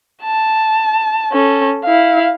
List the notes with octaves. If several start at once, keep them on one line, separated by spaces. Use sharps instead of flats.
A5
C#4 A4
E4 F5